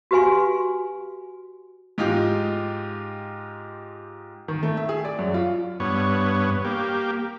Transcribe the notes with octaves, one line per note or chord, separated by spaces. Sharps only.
F#4 G4 B4 F5 G#5 C6
G#2 D#4 F4 G4
D#3
A3
E5
G#4
D5
F#2
F4
G2 B3 C#5
A#3 G4